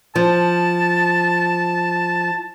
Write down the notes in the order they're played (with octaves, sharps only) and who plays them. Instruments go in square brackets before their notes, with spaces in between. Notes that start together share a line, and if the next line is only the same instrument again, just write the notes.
[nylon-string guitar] F3 [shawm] A5